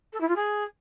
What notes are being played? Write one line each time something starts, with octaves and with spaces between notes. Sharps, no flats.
A4
E4
F4
G#4